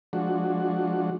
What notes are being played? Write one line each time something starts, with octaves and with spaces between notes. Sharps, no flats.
F3 G#3 D4 F#4